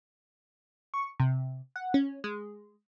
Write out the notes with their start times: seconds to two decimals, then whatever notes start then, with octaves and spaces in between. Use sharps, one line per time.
0.94 C#6
1.20 C3
1.76 F#5
1.94 C#4
2.24 G#3